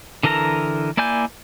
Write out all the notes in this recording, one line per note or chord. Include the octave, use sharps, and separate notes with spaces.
D3 E3 A4 A#4 A#5
A#3 E4 D5 G#5 G6